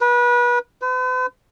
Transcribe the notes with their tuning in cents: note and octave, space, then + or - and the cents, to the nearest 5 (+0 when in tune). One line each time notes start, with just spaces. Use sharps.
B4 -30
B4 +45